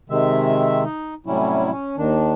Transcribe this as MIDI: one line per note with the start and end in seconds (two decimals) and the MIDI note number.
0.10 0.84 48
0.10 0.84 51
0.10 0.84 56
0.10 0.84 76
0.84 1.14 63
1.26 1.71 45
1.26 1.71 48
1.26 1.71 54
1.26 1.71 55
1.26 1.71 61
1.26 1.71 64
1.71 1.96 61
1.97 2.34 39
1.97 2.34 51
1.97 2.34 62